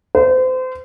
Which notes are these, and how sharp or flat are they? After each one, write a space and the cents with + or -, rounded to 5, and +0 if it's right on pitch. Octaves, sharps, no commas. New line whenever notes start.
C5 -30